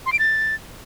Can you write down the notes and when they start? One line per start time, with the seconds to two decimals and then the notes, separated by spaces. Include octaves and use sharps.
0.06 C6
0.13 D7
0.19 A6